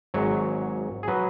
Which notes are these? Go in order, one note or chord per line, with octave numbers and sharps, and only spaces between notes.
G#1 G#2 F#3 C#5
G#4
F#3 B4